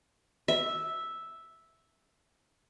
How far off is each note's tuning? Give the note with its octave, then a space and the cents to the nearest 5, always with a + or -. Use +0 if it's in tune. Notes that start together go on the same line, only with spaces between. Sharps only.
E5 -5